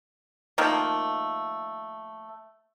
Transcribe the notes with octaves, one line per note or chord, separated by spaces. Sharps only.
D#3 F3 A3 A#3